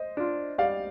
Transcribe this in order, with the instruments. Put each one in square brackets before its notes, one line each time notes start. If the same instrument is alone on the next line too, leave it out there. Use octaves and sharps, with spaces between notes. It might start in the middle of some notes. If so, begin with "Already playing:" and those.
Already playing: [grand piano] C5 D#5
[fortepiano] D4 F4
[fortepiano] G3 [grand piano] D5 F5